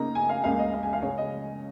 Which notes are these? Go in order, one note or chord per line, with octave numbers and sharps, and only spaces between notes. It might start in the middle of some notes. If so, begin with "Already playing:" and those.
Already playing: C#3 A#3 D#4 A#5
G#5
F5
C#2 C#3 A#3 F5
D#5
F5
G#5
F5
C#2 C#3 G#3 C#4 C#5
D#5